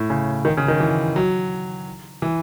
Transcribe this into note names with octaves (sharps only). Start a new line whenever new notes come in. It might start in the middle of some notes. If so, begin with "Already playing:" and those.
Already playing: A2
C#3
D#3
C#3
D#3
E3
F#3
E3